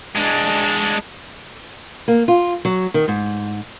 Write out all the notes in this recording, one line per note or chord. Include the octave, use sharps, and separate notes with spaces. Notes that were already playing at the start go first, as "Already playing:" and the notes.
G#3 D4
A#3
F4
F#3
D#3
G#2